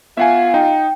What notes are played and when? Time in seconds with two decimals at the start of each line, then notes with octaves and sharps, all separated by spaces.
0.17 B3 F4 E5 F#5 G#5 C7
0.54 D#4 G5